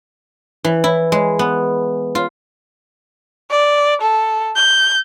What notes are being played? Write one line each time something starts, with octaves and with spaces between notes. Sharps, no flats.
E3
E4
G#3
B3
F4
D5
A4
G6